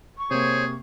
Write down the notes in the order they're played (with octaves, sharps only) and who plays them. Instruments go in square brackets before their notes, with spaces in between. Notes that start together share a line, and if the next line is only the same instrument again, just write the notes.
[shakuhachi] C#6
[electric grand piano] C3 A#3 [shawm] G#4 [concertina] C5 C#5